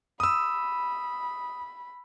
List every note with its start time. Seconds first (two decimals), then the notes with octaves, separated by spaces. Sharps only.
0.20 B5 D#6 E6